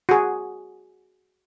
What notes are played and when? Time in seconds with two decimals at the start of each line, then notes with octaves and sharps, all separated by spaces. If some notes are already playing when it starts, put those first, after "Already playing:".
0.09 F#4 G#4